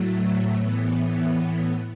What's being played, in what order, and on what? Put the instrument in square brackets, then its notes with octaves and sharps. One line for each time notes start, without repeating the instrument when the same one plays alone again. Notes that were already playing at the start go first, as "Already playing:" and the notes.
Already playing: [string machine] A2 F#3 A3
A2 E3 B3